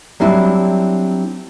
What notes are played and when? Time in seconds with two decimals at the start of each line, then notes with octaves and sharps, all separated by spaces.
0.20 F#3 G3 C4 D4 E4